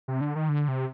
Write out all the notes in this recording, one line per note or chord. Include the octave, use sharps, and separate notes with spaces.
C3
D3
D#3
D3
C3